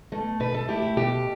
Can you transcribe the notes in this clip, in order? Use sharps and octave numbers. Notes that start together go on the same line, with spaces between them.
B2 A3
B2 B4
A4
A3 E4 G4
G4
B2 G4